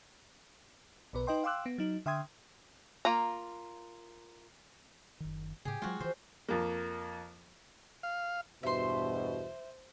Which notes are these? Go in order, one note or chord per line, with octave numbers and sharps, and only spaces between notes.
B1 B2 B4
D#4 B4 D#5 G5 C6
F5 G5 C6 D6 E6 F#6
B3
F#3 D#4
D3 E5 G5 C6 D#6 G#6
A#3 F4 A#5
F#1 D#3
A2 C#3 G4 G#4
F#3 G#3 F4 F#4
D3 E3 C5
F2 A#3
F5
E2 G2 B2 C5 E5 C6